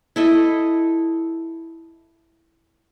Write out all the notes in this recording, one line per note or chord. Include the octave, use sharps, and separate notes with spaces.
E4 A4 D#5